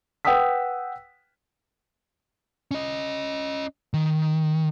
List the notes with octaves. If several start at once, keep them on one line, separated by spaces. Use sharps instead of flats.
B4 F#5 G5 D#6 E6 B6
C#4 D#5
D#3